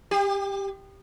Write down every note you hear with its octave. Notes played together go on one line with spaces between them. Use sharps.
G4